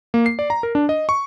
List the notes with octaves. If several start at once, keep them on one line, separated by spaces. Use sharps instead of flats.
A#3
C7
D5
A#5
A#4
D4
D#5
C#6